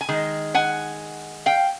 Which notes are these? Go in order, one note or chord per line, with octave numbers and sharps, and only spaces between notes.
G#5
D#3 G#3
F#5 G#5
F5 G5